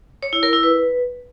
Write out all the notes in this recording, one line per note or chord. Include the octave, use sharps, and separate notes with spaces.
C#5
E4
A#4
E4
B4